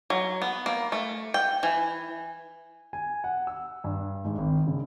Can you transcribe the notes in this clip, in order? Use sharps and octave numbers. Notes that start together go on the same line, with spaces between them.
F#3
B3
A#3
A3
G5
E3
G#5
F#5
E6
G2
G#2
G#1
C#3